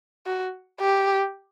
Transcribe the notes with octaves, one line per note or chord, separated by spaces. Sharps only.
F#4
G4